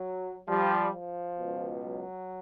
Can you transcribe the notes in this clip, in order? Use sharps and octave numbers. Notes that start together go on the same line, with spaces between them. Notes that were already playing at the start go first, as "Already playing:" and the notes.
Already playing: F#3
F3 G3
F3
C#2 B2
F#3